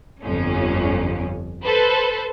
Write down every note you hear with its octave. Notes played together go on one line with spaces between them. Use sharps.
G1 F2 C#4
A4 B4 C5